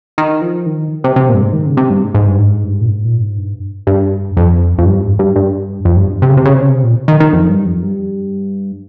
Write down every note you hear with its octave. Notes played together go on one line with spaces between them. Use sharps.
D#3
F3
D#3
C3
C3
A#2
G2
G#2
D#3
C#3
C3
G2
G#2
G#2
G2
G#2
G2
A#2
G#2
A#2
G#2
G2
G2
F2
F2
G2
G#2
G2
G2
F2
G2
C3
C#3
C3
C#3
C3
C#3
C3
A#2
D#3
D#3
F2
G2
F2
G2